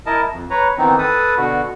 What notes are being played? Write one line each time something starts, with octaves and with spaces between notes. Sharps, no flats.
E4 A#4 D#5 A5
F2
B4 C#5 A#5
D#3 E3 B3 C4 D#4
A4 B4 D#6
B2 D3 F#4